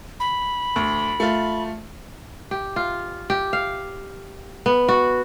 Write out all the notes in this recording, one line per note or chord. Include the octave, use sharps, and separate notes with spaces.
B5
D2
A3 F4
G4
F4
G4
F5
B3
F#4